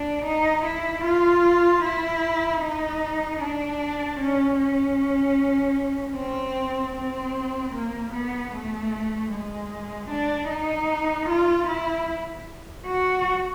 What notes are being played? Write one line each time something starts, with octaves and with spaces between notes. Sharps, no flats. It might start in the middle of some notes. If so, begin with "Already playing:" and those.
Already playing: D4
D#4
E4
F4
E4
D#4
D4
C#4
C#4
C4
C4
A#3
B3
A3
G#3
D4
D#4
F4
E4
F#4